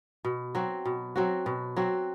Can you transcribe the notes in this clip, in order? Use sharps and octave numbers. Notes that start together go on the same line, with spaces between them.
B2
F#3 C4 F#4
B2
F#3 C4 F#4
B2
F#3 C4 F#4